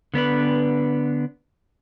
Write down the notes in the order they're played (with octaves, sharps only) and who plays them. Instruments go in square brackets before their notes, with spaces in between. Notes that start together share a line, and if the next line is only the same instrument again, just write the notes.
[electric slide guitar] D3 B3 D4 B4